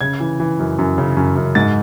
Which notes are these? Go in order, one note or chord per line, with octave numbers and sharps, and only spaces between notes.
C#3 G#6
E3
E3
F#2
F#2
C#3
F#2
F#2
G#2 A6